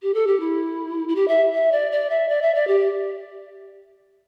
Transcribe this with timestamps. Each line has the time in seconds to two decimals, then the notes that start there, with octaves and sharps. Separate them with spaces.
0.02 G4
0.14 A4
0.27 G4
0.40 E4
1.08 E4
1.15 G4
1.28 E5
1.54 E5
1.72 D5
1.92 D5
2.10 E5
2.29 D5
2.42 E5
2.55 D5
2.67 G4